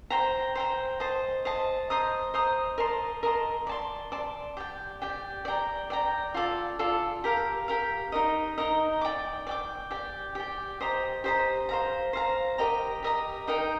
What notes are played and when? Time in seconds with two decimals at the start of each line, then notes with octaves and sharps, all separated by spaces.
0.10 C5 G5 A#5
0.55 C5 G5 A#5
1.00 C5 D#5 A5
1.45 C5 D#5 A5
1.90 C5 D#5 A#5 D#6
2.34 C5 D#5 A#5 D#6
2.78 A#4 D#5 A5 C6
3.23 A#4 D#5 A5 C6
3.67 D5 A5 C6
4.12 D5 A5 C6
4.57 G4 D5 G5
5.02 G4 D5 G5
5.45 D5 G5 A#5
5.90 D5 G5 A#5
6.34 F4 A4 D5
6.79 F4 A4 D5
7.24 G4 A#4 F5
7.68 G4 A#4 F5
8.12 D#4 A#4 D#5
8.58 D#4 A#4 D#5
9.01 D5 G5 D6
9.47 D5 G5 D6
9.91 G4 D5 G5
10.35 G4 D5 G5
10.81 G4 C5 D#5 A#5
11.24 G4 C5 D#5 A#5
11.69 C5 F5 A#5
12.13 C5 F5 A#5
12.58 G4 A#4 D#5 A#5
13.03 G4 A#4 D#5 A#5
13.48 D#4 A#4 D#5 G5